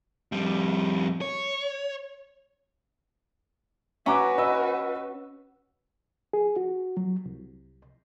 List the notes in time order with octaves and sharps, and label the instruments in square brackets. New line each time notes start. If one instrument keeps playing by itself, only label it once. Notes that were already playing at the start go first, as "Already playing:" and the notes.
[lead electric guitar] F2 G3
C#5
[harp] C#4 [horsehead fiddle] F#4 B4 [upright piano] E5 A#5 D6
[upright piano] D#5 B5 E6
[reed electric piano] G#4
F#4
F#3
C2